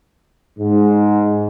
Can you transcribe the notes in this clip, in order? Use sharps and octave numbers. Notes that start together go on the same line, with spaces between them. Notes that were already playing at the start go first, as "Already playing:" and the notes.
G#2